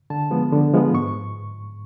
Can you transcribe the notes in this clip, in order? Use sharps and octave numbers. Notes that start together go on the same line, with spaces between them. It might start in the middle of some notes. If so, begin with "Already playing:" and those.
D3 A5
F3 G#3 B3
D3
F3 G#3 B3
G#2 C#6